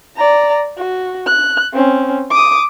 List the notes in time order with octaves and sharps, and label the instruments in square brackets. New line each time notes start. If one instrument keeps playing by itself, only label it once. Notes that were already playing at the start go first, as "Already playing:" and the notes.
[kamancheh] D5 A#5
F#4
F#6
C4 C#4
D6 D#6